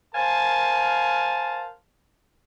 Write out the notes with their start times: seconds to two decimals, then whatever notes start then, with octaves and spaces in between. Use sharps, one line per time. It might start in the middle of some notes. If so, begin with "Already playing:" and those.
0.14 A#4 C5 F5 G#5 A5